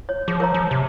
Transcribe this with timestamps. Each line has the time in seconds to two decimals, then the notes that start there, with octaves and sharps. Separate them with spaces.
0.09 C#5
0.28 F3 G#4
0.40 A#4 C#5 A#5
0.54 F3
0.71 C3